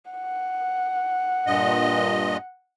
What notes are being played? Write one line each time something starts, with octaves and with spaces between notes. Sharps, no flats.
F#5
G2 A#2 D#5